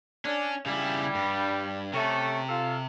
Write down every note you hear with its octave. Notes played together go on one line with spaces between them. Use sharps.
C#4 D4
C#3 G3 E4
G2
C3 A3 C#4 A4
F4 A4 F5